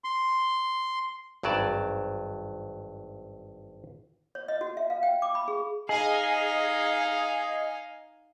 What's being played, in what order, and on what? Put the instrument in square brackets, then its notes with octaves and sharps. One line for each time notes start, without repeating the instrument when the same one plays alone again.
[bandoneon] C6
[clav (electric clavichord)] G#1 G2 F#3 D5 A5
[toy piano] C#5
D#5
F#4
E5
F5
G5
D6
B5
G#4
[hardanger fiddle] D#4 F5 [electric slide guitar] G#4 [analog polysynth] D#5 G#5